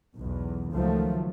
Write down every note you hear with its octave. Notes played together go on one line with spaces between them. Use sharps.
B1 E2
C#2 D#3 F3 F#3 A3